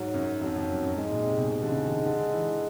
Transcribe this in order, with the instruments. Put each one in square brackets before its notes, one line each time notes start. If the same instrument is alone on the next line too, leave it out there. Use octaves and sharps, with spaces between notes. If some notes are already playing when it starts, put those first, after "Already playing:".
Already playing: [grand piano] G#2 [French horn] F#3
[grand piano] F#2
[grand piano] F2 [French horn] F#3
[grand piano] F2
F#2
F#2
[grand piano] G#2 [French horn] G#3
[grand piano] A#2
C3
B2
[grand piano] C3 [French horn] G#3
[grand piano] D3
C#3
D#3
D3
D3
E3